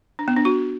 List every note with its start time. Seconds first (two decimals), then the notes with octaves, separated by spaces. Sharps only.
0.19 D4
0.28 B3
0.36 D4
0.45 F#4